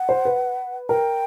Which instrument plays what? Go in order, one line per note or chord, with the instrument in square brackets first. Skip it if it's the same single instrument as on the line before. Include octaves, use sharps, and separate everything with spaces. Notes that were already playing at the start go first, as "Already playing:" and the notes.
Already playing: [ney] F#5
[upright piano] C5
B4
[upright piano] A#4 [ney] G5